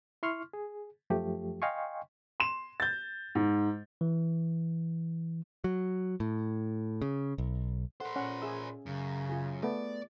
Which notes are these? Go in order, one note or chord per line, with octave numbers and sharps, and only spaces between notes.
E4 C6 C#6 F6
G#4
F#2 F3 A3 G4
D#5 F5 G5 G#5 C6 C#6
C6 E7
G6 A6
G#2
E3
F#3
A2
C#3
B1
A4 A#4 C5 F#5 C6
A#2 C#4 F#5
G#4 E5 E6
F#2 C#3
F4 G#4
A3 B3 D5